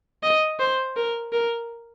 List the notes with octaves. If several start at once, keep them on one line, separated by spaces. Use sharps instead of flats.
D#5
C5
A#4
A#4